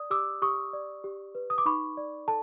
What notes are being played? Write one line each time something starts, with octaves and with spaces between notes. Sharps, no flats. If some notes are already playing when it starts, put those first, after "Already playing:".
Already playing: D5 D#6
G4 D6 E6
G4 C#6 D#6
D5
G4
B4
D#6
D6
D#4 B5 C#6
D5
A4 A5